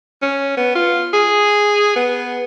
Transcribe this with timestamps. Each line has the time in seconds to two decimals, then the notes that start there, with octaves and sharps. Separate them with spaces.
0.22 C#4
0.57 B3
0.75 F4
1.13 G#4
1.96 B3